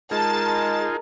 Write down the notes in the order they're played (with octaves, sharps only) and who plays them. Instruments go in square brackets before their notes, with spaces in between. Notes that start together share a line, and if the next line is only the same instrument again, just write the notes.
[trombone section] G#3 A#4 [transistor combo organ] D#4 F4 G#4 [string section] A5